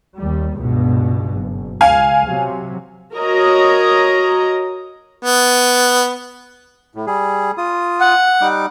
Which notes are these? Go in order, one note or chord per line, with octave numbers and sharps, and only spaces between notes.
D#2 G3
C#2 G2 B2
F#1
C#2 F5 G#5
C3 F#3
F#4 A#4 C#5 D#5 A#5
B3
A2
G3 G#4
F4 D#6
F#5
G3 D#4 D6